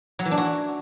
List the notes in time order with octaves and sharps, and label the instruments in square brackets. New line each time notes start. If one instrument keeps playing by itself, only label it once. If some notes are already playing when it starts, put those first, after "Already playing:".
[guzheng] F#3
E3
D4
F#4